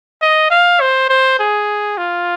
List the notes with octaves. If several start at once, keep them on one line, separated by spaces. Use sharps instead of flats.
D#5
F5
C5
C5
G#4
F4